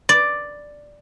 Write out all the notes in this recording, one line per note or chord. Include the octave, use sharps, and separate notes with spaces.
D5